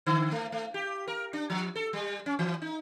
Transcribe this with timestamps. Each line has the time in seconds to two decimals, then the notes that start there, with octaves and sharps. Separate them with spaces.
0.07 D3
0.32 A3
0.52 A3
0.74 G4
1.08 A#4
1.33 D4
1.50 F3
1.76 A4
1.93 G3
2.26 C#4
2.39 E3
2.62 D#4